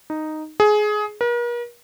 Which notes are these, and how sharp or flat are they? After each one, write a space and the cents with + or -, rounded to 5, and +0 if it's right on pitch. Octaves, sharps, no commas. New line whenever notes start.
D#4 -5
G#4 +20
A#4 +45